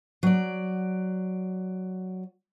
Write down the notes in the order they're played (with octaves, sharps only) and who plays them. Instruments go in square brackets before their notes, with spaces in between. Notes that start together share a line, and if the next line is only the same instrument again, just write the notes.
[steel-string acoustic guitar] F#3 D5